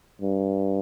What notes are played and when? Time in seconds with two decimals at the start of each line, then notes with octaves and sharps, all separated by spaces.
0.21 G2